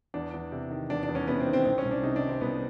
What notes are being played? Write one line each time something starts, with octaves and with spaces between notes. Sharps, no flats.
E2 D4
E2
C3
D#3
E2 D4
D4
E2
C#4
C3 B3
C4
D#3
C4
C2 C4
C#4
C2
D4
C3 D#4
D4
D#3
C4
C2 B3